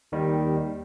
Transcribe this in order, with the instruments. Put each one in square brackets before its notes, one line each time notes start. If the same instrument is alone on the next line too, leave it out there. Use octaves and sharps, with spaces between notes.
[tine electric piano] D#2 D#3 G3